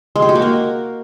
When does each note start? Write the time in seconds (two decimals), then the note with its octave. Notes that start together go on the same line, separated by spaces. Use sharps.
0.16 G#3
0.22 G4
0.29 F#4
0.35 A#3
0.42 A#4